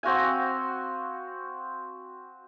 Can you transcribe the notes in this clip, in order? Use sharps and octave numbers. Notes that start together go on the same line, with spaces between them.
C4 F#4 F5 G#5